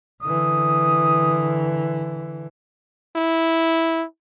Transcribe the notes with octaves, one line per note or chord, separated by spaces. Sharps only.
D3 E3 D#6
E4